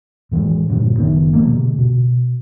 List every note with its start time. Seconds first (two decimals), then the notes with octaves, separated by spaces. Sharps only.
0.32 A2 E3 F#3 G#3
0.69 G2 A#2 D3 D#3
0.97 F#1 D#3 B3
1.33 F3 A3 A#3
1.46 B2 D3
1.78 B2